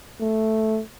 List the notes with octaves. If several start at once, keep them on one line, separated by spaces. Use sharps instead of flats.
A3